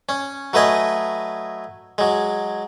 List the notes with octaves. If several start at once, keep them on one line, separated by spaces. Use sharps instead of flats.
C#4
F#3 A3 B4 D#5 G#5
F#3 G#3